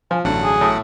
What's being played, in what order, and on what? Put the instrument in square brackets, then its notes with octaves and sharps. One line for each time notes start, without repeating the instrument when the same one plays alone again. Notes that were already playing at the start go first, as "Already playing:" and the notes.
[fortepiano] F3 [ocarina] G#5
[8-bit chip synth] A1 F#3 F#5 [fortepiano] G2 D3 [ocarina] A5
[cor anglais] G#4
[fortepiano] A2 D#6 [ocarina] A5